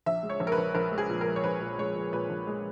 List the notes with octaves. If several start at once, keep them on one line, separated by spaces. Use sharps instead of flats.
A#1 E5
G#3
C#5
A#1
A#4
B4
A#1
A#1 A#4
G#3
G#4
A#2
A#4
G#3
C#5
A#1 B4
A#2
G#3 C#5
A#2
A#2 B4
A#1
G#3